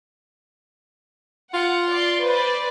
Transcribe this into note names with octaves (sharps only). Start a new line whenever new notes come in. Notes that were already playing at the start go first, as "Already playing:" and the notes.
F4 F#5
D5 C6
B4 C5 D5